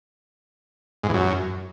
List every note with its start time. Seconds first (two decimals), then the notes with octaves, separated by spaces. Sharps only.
1.03 G#2
1.09 E2
1.14 F#2